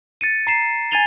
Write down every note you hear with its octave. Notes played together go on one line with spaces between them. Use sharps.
A6 C#7 D#7
A#5 C7 E7
G#5 G#6 A6 D#7 F7 G7